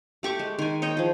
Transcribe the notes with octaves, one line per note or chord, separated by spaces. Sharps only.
A3 G4 C#6 D6
G#3
D#3 G#5
C#5 D#5 G5
F3 G#4